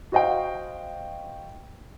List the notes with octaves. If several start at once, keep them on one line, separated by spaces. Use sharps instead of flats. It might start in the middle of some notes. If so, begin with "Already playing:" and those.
F#4 C5 D#5 F5 G5